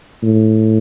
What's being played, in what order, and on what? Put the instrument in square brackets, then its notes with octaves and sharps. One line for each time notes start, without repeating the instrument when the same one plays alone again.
[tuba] A2